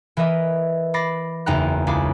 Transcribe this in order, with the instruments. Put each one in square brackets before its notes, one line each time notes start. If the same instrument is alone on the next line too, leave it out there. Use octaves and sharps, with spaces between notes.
[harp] E3 A#4 B4 D#5 E5
B5 D6 A6 A#6 C7
F#1 E2 D#4 G5 A#5 F#6
C#2 E4 G#4 D6